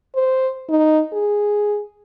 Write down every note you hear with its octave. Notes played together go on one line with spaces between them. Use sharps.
C5
D#4
G#4